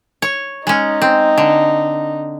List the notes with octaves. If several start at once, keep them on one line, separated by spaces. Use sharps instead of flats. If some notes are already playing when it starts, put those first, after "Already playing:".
C#5
G#3 C#4 D#4
C4
D3